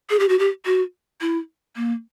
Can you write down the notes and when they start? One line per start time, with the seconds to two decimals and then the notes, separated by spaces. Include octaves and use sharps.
0.10 G#4
0.20 G4
0.29 F#4
0.39 G4
0.65 F#4
1.21 E4
1.76 A#3